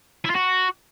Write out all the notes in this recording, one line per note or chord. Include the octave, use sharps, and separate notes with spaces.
E4
F4
F#4